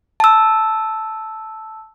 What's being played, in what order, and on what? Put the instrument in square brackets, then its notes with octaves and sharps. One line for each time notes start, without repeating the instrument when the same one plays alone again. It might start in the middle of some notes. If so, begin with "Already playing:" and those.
[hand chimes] A5 E6